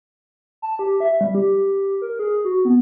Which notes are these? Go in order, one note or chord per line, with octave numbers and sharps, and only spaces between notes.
A5
G4
E5
G3
G4
A#4
G#4
F#4
B3